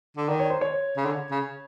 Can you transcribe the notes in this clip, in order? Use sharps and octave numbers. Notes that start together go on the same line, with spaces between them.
D3
D#3 D5
C#5
C5
C#5
C#3
D3
C#3